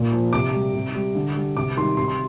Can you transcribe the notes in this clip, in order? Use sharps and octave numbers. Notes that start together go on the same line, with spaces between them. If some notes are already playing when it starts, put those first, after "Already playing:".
Already playing: A#2
F3
C3 D6
G3
C3
G3
D3
G3
C3 D6
D#3 G3 C6
C3 C6
C6